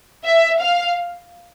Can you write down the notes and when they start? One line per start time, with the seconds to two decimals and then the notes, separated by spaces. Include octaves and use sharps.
0.25 E5
0.60 F5